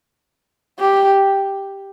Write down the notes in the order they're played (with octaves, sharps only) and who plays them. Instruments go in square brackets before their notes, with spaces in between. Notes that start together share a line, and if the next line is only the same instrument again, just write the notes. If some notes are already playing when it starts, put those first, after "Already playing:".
[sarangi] G4